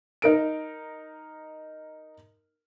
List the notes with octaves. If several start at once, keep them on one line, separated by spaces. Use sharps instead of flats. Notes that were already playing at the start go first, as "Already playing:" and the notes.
D#4 A#4 D7